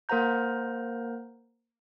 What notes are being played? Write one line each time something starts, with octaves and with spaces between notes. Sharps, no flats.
A#3 A#4 C5 F#5 A#5 G6